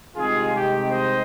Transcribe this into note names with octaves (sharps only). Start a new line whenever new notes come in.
C2 C3 D#3 G#3 F4 G#4
G4
C5 D#5